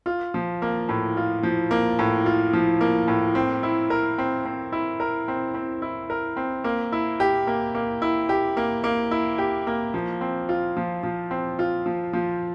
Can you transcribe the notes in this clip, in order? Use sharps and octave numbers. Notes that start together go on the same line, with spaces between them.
F4
F3
A#3
A2
F4
F3
A#3
A2
F4
F3
A#3
A2
C4
E4
A#4
C4
C4
E4
A#4
C4
C4
E4
A#4
C4
A#3
E4
G4
A#3
A#3
E4
G4
A#3
A#3
E4
G4
A#3
F3
C4
F4
F3
F3
C4
F4
F3
F3